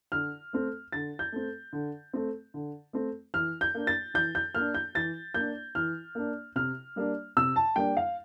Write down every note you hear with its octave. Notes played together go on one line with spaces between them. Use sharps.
D3 F6
A3 C4
D3 A6
G6
A3 C4
D3
A3 C4
D3
A3 C4
E3 F6
G6
A#3 D4
A6
E3 G6
G6
A#3 D4 F6
G6
E3 A6
A#3 D4 G6
E3 F6
A#3 D4
C3 F6
G3 A#3 D4
C3 E6
A5
G3 A#3 D4 G5
F5